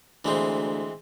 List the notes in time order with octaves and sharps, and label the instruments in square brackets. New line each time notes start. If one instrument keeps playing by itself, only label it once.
[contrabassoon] D2 [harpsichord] E3 G#3 C4